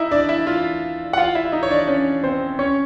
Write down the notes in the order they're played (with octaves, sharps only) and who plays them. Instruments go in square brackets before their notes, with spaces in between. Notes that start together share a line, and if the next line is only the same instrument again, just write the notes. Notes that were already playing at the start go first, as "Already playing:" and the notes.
Already playing: [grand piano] D#4 E4 D#5 E5
D4 D5
E4 E5
F4 F5
F#5
F4 F5
E4 E5
D#4 D#5
C#5
D4 D5
C#4 C#5
C4 C5
C#4 C#5